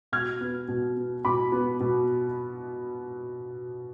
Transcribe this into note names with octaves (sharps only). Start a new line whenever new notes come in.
B2 F6 G#6
B3
B2
B3
B2 B5 D6
B3
B2